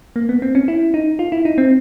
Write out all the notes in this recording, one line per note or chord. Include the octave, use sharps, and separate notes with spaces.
A#3
B3
C4
C#4
E4
D#4
F4
E4
D#4
C4